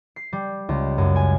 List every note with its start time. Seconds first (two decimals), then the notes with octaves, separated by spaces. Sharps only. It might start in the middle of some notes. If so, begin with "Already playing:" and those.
0.16 C7
0.33 G3
0.69 C#2
0.98 F#2
1.16 G#5